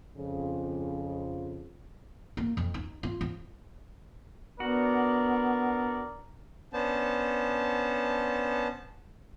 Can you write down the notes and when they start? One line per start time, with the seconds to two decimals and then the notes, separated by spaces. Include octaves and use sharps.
0.17 F2 C#3 F3
2.37 A#3
2.57 F2
2.74 D#4
3.03 F4
3.21 F3
4.60 B3 D4 F#4 A#4 D5
6.73 B3 C#4 D4 C5 A5